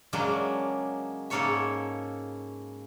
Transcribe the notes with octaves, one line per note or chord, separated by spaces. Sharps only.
C#3 F#3 G#3 A#3 D4
G#2 C#3 A#3 A4 C#5 E5